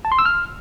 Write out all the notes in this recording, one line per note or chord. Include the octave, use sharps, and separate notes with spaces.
A5
C6
E6
F6